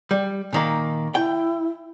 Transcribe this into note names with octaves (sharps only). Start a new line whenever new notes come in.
G3
A#2 D#3 A#3
E4 G5